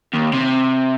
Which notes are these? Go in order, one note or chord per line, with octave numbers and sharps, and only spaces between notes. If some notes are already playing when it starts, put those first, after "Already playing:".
D#2
C3